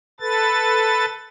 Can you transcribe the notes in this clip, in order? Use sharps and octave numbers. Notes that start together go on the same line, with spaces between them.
A4 B4 A6